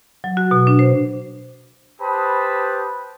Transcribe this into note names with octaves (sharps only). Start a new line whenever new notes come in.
F#3
F#4
B2
D4
C5
G4 B4 C5 A5 B5 D#6